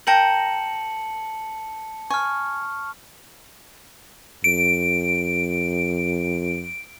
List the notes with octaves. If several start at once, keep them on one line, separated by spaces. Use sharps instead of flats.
A#4 G5 A5 A#5 C#7 F#7
G#5 C#6 F6
F2 D7